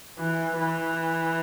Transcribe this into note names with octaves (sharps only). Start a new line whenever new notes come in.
E3
E3